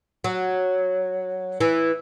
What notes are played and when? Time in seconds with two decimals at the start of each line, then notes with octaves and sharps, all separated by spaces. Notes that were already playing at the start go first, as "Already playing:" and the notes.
0.24 F#3
1.60 E3